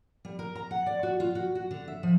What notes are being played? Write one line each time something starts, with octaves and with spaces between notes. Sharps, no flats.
G3
A#4
A#5
F#5
D5
F#4
F4
F#4
F#4
D3
E5
F3